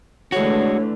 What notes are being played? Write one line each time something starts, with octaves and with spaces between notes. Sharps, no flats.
D3 E3 G#3 A3 F#4 C#5